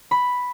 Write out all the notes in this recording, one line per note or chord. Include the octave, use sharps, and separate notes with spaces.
B5